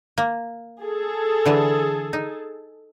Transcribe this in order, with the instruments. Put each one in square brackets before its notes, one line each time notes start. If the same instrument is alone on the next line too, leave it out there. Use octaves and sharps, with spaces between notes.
[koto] A#3
[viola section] G#4 A4
[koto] D3 E3 A5
D#4